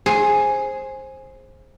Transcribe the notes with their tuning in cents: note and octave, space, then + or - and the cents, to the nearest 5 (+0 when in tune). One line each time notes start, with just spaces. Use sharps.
G#4 +0 C5 +20